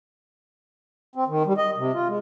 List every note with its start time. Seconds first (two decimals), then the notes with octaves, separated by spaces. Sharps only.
1.16 C4
1.28 D#3
1.46 G3
1.58 D#5
1.77 C3
1.93 F4
2.08 G#3